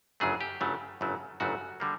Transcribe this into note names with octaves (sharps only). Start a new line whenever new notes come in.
G1 F#2 C#3 F#3 A3 G#4
G4
G1 F#2 C#3 F#3 A3
G1 F#2 C#3 F#3 A3
G1 F#2 C#3 F#3 A3 F#4
D3 G3 A#3